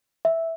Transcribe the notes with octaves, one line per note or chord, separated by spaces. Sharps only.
E5